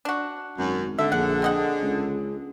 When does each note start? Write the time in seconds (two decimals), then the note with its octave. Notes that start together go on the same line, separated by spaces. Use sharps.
0.05 D4 F#4
0.58 G#1 F#2
0.98 D3 A4 E5
1.12 A#1 G#4 F#5
1.42 C4 D#5 F#5
1.82 C#2